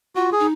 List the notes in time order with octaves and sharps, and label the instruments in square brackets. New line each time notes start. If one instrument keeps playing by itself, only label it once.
[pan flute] F4 [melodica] F#4
[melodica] G#4
[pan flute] D#4